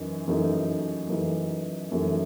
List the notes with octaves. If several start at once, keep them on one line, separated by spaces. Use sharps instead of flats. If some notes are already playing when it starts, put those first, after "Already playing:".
Already playing: F#2 E3 D#4
F#2 E3 A3 D#4
F#2 E3 A3 D#4
F#2 E3 A3 D#4